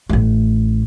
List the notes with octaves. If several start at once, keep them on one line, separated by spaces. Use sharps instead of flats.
A1 A3